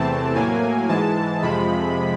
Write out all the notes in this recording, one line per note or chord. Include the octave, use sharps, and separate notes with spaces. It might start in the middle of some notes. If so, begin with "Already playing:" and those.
Already playing: E2 C3 E3 A3 C4 A5
A2 F#3 A#3 G#5
G#2 E3 G#3 A5
F2 C3 F3 G#3 B5